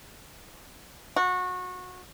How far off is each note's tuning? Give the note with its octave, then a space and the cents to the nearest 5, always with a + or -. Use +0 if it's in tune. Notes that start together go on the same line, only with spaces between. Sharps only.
F#4 -25